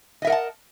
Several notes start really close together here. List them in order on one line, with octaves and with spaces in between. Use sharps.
D#5 E5 A#4 F#5 A5